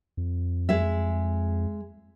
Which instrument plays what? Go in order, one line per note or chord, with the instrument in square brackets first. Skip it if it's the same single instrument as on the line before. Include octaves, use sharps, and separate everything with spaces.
[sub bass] F2
[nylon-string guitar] G#3 E5